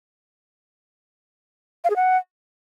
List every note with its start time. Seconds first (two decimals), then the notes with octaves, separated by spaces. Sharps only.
1.84 F5
1.90 G#4
1.96 F#5